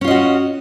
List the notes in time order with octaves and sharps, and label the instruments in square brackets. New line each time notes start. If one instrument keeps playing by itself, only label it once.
[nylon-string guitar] C#4
F4
D#5
F#4